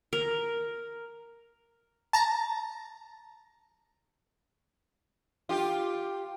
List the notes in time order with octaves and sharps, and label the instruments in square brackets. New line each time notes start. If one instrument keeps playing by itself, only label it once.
[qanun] A#4
[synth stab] A5 A#5
[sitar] F4 G4